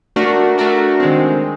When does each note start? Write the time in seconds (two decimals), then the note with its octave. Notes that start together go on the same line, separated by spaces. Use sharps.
0.16 A3 D4 F#4 A#4
0.58 A3 D4 F#4 A#4
1.00 D#3 G#3 C4